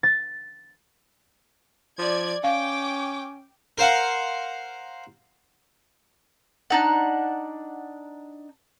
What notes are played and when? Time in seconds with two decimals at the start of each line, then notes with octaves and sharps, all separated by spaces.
0.03 A6
1.99 F3 D5 G#6
2.44 C#4 F5 G5 D6
3.78 A#4 C5 F5 F#5
6.70 D4 D#4 F#5